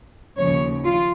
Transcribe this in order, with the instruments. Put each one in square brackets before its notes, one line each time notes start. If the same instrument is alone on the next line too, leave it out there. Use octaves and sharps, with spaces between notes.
[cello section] D#2 C#3 F3 C#5
F4